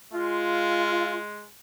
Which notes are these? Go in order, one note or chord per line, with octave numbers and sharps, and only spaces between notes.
G#3 F4